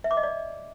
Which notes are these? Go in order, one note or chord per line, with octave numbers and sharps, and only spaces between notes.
E5
D6
D#5
D5